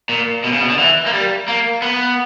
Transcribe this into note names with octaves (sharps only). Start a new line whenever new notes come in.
A#2
B2
C#3
B2
D3
E3
A#3
G3
A#3
B3